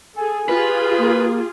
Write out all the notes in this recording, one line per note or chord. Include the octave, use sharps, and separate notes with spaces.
G#4 A4 G#5
F4 G4 G#4 B4
A#3